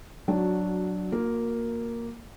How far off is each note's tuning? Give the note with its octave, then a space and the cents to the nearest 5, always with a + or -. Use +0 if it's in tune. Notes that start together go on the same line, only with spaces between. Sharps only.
F#3 +0 D4 +0 F#4 -15
A#3 +0 F#4 -45 A#4 +0